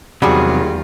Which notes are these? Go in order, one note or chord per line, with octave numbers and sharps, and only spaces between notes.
E2 C3 D#3 F#3 G3 F4 F#4 G#4